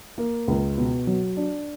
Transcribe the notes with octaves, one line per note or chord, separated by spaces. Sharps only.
A#3
C#2
B2
F#3
D4